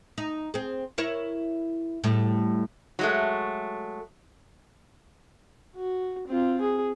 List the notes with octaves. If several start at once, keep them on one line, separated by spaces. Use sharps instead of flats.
D#4
C4 G#4
E4 A#4 C#5
A2 G3
F#3 G#3 A3
F#4
C4 F4
G#4